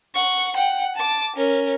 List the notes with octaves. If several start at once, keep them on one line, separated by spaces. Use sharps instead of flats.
F#5 C#6
F#5 G5
A5 D6
C#4 A#4